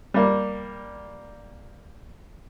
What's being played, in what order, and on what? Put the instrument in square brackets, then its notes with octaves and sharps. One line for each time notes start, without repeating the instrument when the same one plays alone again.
[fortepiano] G3 A#3